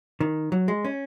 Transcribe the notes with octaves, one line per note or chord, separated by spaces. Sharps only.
D#3
F#3
G#3
C#4